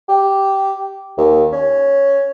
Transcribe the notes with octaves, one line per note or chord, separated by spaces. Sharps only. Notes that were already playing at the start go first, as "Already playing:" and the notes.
G4
D#2
C#4